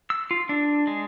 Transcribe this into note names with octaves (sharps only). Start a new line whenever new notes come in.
E6
F4
D4
G#3